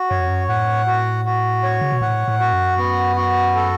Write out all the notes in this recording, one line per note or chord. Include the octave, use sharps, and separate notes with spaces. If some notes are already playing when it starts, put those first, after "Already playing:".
Already playing: F#4
F#2 C#5
F2
F#2
A2 F#5
F#4
F#4
C#5
C#3
B2
A2 F#5
A2
F#4
F#2
B3
F#4
A4